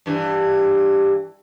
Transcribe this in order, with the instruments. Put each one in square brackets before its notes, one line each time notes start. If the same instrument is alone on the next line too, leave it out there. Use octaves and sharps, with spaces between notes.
[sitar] G2 E3